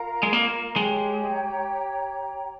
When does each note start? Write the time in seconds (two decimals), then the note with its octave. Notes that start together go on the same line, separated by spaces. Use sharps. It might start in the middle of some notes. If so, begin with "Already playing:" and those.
Already playing: F4 A#4 F5 A#5
0.23 G#3
0.33 A#3
0.76 G#3 G4 C#5 G5 A#5